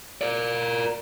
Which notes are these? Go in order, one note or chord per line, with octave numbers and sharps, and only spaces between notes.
A#4 D5